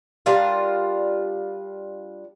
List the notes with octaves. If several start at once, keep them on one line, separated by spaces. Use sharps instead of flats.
G3 D4 F4 A#4